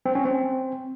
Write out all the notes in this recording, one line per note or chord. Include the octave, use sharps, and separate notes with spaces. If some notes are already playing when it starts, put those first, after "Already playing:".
C4
C#4
C4